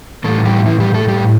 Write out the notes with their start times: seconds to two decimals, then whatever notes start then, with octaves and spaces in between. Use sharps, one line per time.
0.24 A2 E3 G3 A3 A4
0.45 G3 G4
0.66 E3 E4
0.80 G3 G4
0.94 A3 A4
1.08 G3 G4